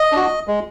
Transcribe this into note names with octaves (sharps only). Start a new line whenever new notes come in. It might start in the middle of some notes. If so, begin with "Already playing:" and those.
Already playing: D#5
D4 F#4
G#3